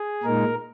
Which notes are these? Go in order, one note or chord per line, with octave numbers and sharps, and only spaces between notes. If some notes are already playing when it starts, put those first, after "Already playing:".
Already playing: G#4
A#2 G#3 D#4 A#4